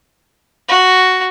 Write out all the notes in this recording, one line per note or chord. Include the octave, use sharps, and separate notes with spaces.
F#4